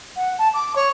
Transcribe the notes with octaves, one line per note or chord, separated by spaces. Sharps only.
F#5
A5
D6
C#5